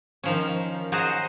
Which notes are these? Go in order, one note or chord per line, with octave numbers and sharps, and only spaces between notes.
D#3 F3 C#4
F#3 F#4 G#4 C5 D#5